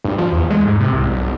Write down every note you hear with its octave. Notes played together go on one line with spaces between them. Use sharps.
G2
F3
E2
G#3
G#2
C3
C2
B1